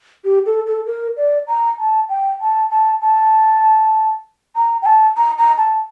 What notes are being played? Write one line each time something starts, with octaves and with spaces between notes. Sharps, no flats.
G4
A4
A4
A#4
D5
A#5
A5
G5
A5
A5
A5
A#5
G5
A5
A#5
A#5
A5